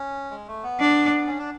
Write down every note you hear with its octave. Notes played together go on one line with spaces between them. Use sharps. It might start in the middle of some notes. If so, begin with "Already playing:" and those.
Already playing: C#4
G#3
A3
B3
D4
C#4
D4